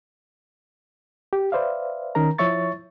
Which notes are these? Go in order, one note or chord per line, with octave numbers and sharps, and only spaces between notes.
G4
B4 C5 D5 E5 F5
D#3 C#4 A#4 A#5
F3 E4 C#5 E5 C#6 A6